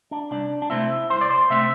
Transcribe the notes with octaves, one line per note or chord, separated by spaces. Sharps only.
D4
C2 D4
D4
C3 A3 C4 E4
C2 C5
D5
C5
C3 A3 C4 E5